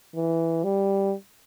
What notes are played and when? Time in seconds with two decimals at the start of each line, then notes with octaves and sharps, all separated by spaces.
0.15 E3
0.64 G3